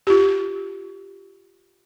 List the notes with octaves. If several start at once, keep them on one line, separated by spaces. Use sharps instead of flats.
F4 G4